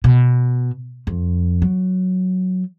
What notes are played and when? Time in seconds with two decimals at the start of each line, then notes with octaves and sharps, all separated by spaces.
0.04 B2
1.07 F2
1.62 F#3